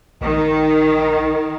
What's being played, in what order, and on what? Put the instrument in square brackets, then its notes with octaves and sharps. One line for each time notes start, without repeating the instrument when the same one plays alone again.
[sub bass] A#1 [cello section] D#3